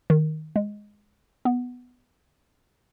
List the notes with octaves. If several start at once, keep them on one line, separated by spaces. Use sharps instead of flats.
D#3
G#3
B3